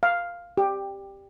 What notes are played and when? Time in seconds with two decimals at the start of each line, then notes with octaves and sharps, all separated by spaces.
0.03 F5
0.57 G4